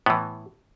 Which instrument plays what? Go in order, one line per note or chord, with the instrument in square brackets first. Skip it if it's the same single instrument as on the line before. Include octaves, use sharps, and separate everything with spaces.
[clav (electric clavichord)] A2 E3 B3